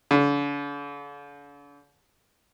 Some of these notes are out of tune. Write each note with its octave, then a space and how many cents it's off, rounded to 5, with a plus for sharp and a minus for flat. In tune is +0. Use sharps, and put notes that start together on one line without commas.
D3 -45